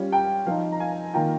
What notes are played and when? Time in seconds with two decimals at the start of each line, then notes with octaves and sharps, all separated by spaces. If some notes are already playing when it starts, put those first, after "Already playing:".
Already playing: G3 C#4 F4
0.12 G5
0.46 F3 C4 D#4 F5
0.72 A#5
0.80 F5 G#5
1.14 D#3 A#3 F4 G5 A#5